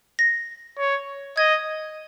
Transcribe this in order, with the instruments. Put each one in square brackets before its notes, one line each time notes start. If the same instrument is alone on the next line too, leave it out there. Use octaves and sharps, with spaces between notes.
[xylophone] A#6
[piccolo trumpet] C#5
[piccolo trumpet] D#5 [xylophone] G#6